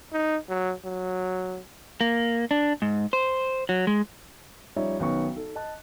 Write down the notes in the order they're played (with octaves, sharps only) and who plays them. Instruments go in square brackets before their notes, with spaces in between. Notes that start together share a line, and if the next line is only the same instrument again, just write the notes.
[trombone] D#4
F#3
F#3
[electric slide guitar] A#3
D4
G#2
C5
F#3
G#3
[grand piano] F3 G3 C#4 D#4 C#5 E5
B1 D#3 B3 C#4 C#6
D#4 A4
D#5 A5 F#6